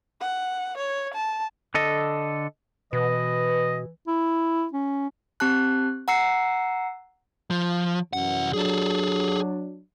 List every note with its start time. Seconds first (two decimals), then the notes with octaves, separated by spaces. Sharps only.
0.21 F#5
0.77 C#5
1.14 A5
1.74 D3 A4 D#5
2.93 B2 E3 B4 D#5
4.08 E4
4.73 C#4
5.40 C4 G4 A5 F#6
6.08 F#5 A#5 E6 C7 C#7
7.51 F3
8.13 C2 F#2 E3 F#5
8.53 F#3 D4 G#4 A4